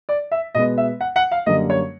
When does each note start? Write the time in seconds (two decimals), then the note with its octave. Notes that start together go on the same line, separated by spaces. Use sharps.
0.09 D5
0.32 E5
0.55 B2 G#3 B3 D#5
0.78 E5
1.01 F#5
1.16 F#5
1.31 F5
1.46 F#2 D3 G3 A#3 D#5
1.70 C#5